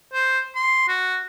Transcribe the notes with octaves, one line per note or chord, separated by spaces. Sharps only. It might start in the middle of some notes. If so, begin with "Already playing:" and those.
C5
C6
F#4